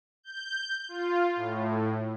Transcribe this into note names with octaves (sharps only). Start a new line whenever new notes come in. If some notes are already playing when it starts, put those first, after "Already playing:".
G6
F4
A2